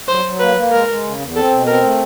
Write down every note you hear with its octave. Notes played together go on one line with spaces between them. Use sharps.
F#3 C5
F#3
A#3 B4
A#3
G#3 A#4
G#3
C#3
E2
C4 A4
B2
C4 A#4
A3